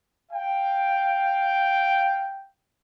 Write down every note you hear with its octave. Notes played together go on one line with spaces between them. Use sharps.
F5 G5